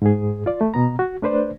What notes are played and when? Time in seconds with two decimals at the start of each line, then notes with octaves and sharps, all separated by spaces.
0.02 G#2 G#4
0.46 F4 D5
0.61 A3
0.74 B2 B3 A#5
0.99 F#4
1.22 A3 D4 B4 C5 D5